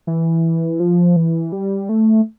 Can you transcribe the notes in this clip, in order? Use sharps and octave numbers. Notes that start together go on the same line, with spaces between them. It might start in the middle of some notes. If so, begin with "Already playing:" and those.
E3
F3
E3
G3
A3